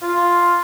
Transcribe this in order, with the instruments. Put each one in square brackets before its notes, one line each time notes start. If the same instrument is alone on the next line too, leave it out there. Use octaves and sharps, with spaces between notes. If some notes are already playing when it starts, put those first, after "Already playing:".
[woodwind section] F4